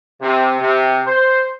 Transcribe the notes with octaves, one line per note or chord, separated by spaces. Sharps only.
C3
C3
C5